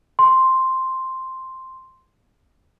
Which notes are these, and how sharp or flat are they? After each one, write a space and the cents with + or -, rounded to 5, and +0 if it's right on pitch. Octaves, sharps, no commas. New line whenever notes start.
C6 +0